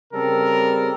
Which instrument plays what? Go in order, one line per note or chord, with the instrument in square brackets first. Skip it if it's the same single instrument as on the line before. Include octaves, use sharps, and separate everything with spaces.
[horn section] C#3 G3 C4 A4 A#4